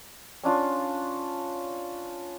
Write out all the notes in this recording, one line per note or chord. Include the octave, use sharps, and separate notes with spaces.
C#4 D4 F4